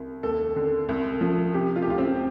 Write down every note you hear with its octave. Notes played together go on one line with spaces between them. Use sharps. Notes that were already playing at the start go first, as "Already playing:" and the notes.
Already playing: C2
D#2 A4
D3
C2
F3
C3 G4
F4
G4
D2 F4
C4